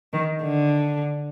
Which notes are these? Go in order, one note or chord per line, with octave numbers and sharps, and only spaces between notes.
D#3
D3